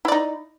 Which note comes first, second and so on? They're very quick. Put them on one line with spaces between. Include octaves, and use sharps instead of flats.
E4 D5 D#4